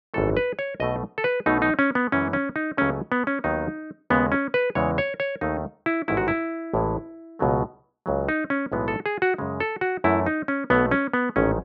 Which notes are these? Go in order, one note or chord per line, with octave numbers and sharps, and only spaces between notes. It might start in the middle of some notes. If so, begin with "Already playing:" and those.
G#1 F#2 E3 A3 A4
B4
C#5
B1 B2 A3 D#5
A4
B4
B1 B2 A3 D#4
D#4
C#4
B3
F#2 E3 G#3 C#4
C#4
D#4
C#2 C#3 F#3 A3 C#4
B3
C#4
D#2 D#3 F#3 B3 D#4
D#2 C#3 G#3 B3
C#4
B4
E2 C#3 E3 G#3 C#5
C#5
C#5
D#2 D#3 A3 D#4
E4
A1 G#2 D#3 G#3 E4
F#4
E4
A1 A2 E3 G#3
C#2 B2 F#3 A3
C#2 C#3 F#3
D#4
C#4
B1 A2 E3 G#3 B3
A4
G#4
F#4
F#2 C#3 G#3
A4
F#4
F#2 E3 A3 E4
D#4
C#4
B1 B2 A3 B3
C#4
B3
A1 G#2 D#3 A3 C#4